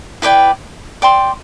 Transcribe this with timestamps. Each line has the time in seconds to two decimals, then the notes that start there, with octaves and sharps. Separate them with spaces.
0.22 E4 B4 D5 G5
1.02 D5 G5 C6